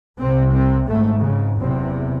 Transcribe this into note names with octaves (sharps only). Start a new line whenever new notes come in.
C2 C3 C4
C4
G#1 G#2 A3
C#3
F#1 E2 C3 C4